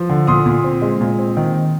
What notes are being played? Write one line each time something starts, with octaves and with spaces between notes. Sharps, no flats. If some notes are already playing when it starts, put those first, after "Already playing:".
Already playing: F3
D3
A#2 C6 D#6
A#2
C4
G#3
A#2
C4
D#3